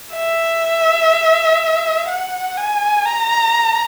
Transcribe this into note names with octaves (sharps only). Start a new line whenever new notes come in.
E5
F#5
G#5
A#5